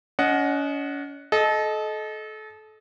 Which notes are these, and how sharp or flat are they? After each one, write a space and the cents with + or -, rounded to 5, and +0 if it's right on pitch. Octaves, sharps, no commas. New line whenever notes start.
C#4 +35 D#5 +0 F#5 +0
A4 -30 D#5 +0